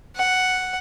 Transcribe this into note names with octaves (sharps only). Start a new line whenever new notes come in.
F#5